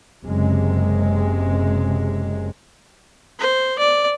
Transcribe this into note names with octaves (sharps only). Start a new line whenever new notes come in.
F#1 C3 G#3
C5
D5